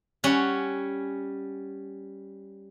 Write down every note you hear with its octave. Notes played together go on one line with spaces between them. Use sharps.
G3 C#4 F#5